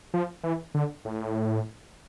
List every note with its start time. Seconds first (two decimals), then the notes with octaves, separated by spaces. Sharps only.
0.14 F3
0.44 E3
0.74 D3
1.05 A2